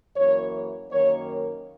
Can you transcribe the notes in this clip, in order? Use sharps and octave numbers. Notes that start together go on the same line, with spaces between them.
F#2 E3 A#3 C#5
F#2 D#3 A#3 C#5